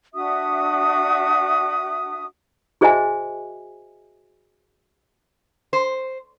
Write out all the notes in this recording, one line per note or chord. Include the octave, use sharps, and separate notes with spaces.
D4 F#4 E5 D#6
F#4 G#4 C5 D#5 E5 G#5
C5